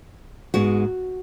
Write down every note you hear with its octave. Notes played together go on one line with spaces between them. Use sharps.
G#2 G#3 B3 F#4